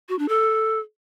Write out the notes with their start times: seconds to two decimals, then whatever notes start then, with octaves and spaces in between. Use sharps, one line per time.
0.09 F#4
0.19 D4
0.29 A4